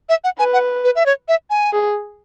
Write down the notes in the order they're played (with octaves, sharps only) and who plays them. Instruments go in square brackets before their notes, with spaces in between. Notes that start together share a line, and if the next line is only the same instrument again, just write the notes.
[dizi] E5
F#5
[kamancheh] B4 [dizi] G#5
[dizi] F#5
B4
E5
C#5
E5
G#5
[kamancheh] G#4